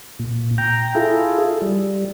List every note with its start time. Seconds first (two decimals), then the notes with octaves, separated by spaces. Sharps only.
0.19 A#2
0.58 G5 A#5
0.95 E4 F4 G#4 A4
1.62 G3